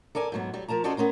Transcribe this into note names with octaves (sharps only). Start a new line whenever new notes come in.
A4 A#4 D5 G#5
G#2 F#3 B3
F#3 G3
F3 A#4 A5 A#5
C#4 F#4 A4 C5 D5 D#5
B3 C#4 A#4 C5